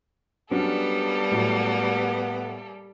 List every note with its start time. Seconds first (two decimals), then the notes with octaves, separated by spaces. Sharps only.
0.51 F#3 G3 A#3 B3 C#4 D4 A4
1.31 A2 F#3